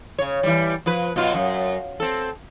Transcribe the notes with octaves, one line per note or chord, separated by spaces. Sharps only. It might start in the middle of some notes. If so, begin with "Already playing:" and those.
C#3 C#5
E3 G3
F3 B4
B2 F#3 F4
F#2
C4 A4